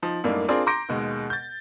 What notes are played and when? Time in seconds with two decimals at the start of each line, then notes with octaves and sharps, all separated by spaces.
0.02 F3 D#4
0.24 F#2 A2 G3 A#3 D4 D#4
0.48 C4 D4 F4 G#4 A#4 D5
0.66 A#5 C6 D6 G6 A#6 D7
0.89 D#2 B2 G#3
1.30 G6 A6